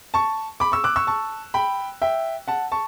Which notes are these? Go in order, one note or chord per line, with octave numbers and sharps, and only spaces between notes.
A5 C#6
B5 D6
C#6 E6
D6 F#6
C#6 E6
A5 C#6
G5 B5
E5 G5
F#5 A5
A5 C#6